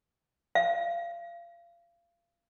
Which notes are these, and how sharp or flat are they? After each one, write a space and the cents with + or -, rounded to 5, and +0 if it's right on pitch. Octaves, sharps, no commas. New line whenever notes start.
F5 -30